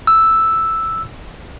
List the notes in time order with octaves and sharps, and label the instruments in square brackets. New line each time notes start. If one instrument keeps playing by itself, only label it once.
[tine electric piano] E6